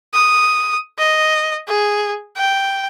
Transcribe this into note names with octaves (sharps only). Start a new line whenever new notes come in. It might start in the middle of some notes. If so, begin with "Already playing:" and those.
D#6
D#5
G#4
G5